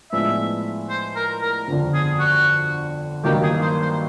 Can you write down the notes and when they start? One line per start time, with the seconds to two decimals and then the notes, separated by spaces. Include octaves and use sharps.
0.12 A2 F3 G#3 B3 D4 E5
0.90 C5
1.16 A#4
1.42 A#4
1.68 G1 F2 D3
1.94 G#4
2.19 F#4
3.24 G2 D#3 F#3 A#3 G4
3.43 G#4
3.62 C5
3.82 C5